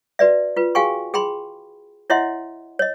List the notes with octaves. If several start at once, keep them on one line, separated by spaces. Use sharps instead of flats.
F#4 B4 D5 E5
F4 B4
F#4 G#4 F5 G5 G#5 C#6
G#4 G5 B5 C6
E4 C#5 D#5 E5 F#5 C6
C#5 D#5